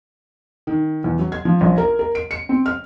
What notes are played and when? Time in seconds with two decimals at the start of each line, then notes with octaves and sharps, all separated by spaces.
0.67 D#3
1.04 E2
1.19 F#3
1.32 G#6
1.45 F3
1.61 A#1
1.78 A#4
1.99 A#4
2.15 D7
2.31 C#7
2.49 C4
2.66 F6